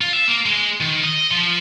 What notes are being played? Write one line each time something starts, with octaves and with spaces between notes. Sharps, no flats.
F4
E5
A#3
G#3
D#3
D#5
F3